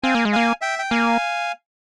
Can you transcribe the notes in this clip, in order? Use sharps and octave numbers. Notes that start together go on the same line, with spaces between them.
C4 F5 G#5
A#3
G#3
A#3 F5 G#5
E5 G5
G5
A#3 F5 G#5